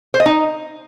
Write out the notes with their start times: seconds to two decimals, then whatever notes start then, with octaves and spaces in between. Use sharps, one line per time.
0.14 C5
0.20 D#5
0.26 D#4